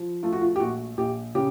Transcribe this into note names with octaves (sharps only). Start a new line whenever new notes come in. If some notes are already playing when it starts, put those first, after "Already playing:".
Already playing: F3
A3 F4
F#4
F4
G4
A#1 F#4
A#1 G4
C#3 G4